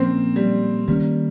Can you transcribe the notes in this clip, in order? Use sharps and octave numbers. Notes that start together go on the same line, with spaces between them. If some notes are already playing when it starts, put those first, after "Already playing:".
Already playing: A#2 F3 A#3 C4 C#4
G3
D#3 G3 A#3 C#4